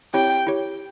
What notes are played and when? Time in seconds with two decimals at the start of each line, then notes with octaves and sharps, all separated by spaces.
0.14 C4 E4 G4 C#5 G5
0.47 E4 G4 C#5